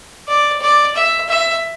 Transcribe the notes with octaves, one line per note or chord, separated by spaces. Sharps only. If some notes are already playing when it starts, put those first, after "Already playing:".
D5
D5
E5
E5